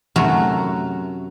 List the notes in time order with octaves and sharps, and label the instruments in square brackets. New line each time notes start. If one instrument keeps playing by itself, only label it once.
[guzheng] F#2 C3 A3 F#4 A#4 A#5